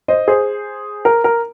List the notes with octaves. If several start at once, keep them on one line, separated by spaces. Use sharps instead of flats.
C5 D#5
G#4 C5
A#4
A#4